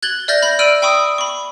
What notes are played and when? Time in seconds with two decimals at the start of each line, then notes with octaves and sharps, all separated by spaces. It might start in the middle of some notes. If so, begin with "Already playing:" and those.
0.03 F#6 G#6 A6 F#7 G7
0.28 D5 E5 F6 G6 A6 A#6
0.42 B5 G6 A#6
0.59 D5 E6 F6 D7 D#7 F#7
0.82 G5 B5 C#6 D#6 E6
1.18 B5 C#6